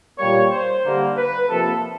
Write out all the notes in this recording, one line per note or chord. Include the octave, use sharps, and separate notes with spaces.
A#2 G3 A#3 C#5
C5
D3 G3 A#3
B4
C3 F3 A#3 A4